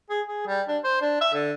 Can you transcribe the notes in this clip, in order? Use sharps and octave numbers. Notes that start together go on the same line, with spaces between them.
G#4
G#4
G3
D4
C5
D4
E5
D3